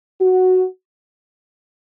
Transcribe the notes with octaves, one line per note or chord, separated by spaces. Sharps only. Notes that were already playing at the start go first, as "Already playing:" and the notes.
F#4